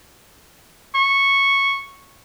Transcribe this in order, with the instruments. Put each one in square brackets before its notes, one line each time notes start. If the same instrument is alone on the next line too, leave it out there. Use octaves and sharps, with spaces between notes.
[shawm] C#6